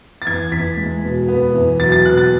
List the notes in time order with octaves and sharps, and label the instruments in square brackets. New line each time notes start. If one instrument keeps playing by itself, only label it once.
[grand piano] A6
E2 G#6
E2 B6
G#3
B2
B3
E2
F#3 A6
A6
B2 F#6
A6